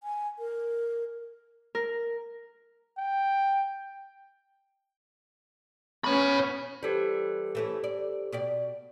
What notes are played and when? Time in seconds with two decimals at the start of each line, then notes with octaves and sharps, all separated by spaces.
0.03 G#5
0.39 A#4
1.75 A#4
2.98 G5
6.04 B3 C#4 C#5 B5
6.83 E3 G3 G4 A4 C5
7.55 E3 A3 C#4
7.84 D5
8.32 B2 G4 D5